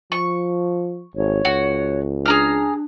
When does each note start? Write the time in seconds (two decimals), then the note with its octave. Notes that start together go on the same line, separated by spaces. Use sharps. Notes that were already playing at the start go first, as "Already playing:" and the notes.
0.12 F3 C#6
1.16 G#1 C#5
1.45 C#2 F#4
2.26 D4 G#4 A#5 F6